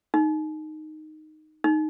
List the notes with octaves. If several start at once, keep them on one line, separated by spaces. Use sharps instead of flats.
D#4
D#4